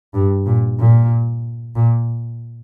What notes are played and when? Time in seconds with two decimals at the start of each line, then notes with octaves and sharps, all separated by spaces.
0.14 G2
0.46 A#2
0.79 A#2
1.76 A#2